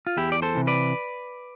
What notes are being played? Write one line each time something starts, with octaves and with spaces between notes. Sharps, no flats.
F4
E2 E4 G4
D5
A4 C5
C3 E3
B4 D5